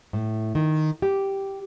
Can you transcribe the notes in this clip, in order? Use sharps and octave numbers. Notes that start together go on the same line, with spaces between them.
A2
D#3
G4